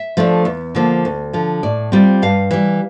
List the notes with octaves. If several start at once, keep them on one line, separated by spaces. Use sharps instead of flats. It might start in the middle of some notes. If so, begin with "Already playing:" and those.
Already playing: E5
F3 A3 D4
E2
D3 F3 A#3
D2
D3 F3
A2 D5
G3 C4 F4
G2 F5
E3 G3